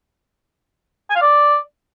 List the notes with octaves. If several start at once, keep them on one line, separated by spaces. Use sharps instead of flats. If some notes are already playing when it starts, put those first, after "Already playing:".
G#5
F5
D5